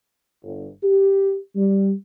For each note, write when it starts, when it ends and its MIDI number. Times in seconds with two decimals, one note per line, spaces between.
0.43 0.68 31
0.83 1.35 67
1.56 1.92 55